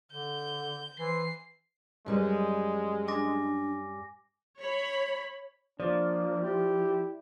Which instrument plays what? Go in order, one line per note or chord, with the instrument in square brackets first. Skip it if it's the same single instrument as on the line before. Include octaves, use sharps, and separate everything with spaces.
[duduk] D3 [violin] G6
[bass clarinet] E3 [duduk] C5 [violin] C7
[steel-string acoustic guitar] F#2 G3 B4 [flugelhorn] G#3
[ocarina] D4 [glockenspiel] G#5 D6 A#6
[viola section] C#5 B5
[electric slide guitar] F3 [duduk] A#3 [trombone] D4 [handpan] D5
[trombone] E4 [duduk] G4